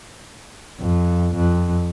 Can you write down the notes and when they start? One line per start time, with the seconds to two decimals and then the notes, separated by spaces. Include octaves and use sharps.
0.80 F2
1.36 F2